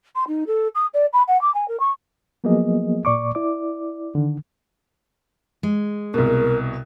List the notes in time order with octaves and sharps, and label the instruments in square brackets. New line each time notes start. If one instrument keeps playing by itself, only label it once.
[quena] C6
D#4
A4
D#6
D5
B5
F#5
D6
G#5
A#4
C#6
[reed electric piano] F3 F#3 A#3 B3 G#4 D#5
A#2 D5 C#6 D6
E4 D5 D6
D3 D#3
[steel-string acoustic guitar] G#3
[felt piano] C2 B2 [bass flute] A#4